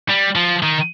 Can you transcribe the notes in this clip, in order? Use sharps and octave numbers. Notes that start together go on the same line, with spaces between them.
G3
F3
D#3